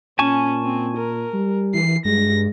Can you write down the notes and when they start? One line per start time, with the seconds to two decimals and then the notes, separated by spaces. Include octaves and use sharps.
0.19 A#2 C#4 G#5 A5 C#6
0.64 C4
0.97 A#4
1.34 G3
1.74 E3 C7
2.05 G2 G#3 A#6